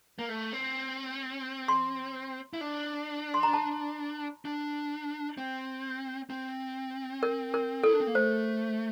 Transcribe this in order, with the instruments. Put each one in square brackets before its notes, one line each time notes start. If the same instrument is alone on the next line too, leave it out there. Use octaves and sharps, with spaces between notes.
[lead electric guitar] A#3
A3
C4
[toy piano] C6
[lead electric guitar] E4
D4
[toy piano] C6
A#5
A5
[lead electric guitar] D4
C4
C4
[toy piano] A#4
A#4
[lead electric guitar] E4 [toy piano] A4
[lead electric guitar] D4
C4
A#3
[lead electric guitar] A3 [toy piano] C5